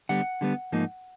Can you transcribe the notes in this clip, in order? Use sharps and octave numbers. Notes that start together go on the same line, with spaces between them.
D3 G3 B3 F#5
D3 G3 B3
G#2 F3 A#3 D#4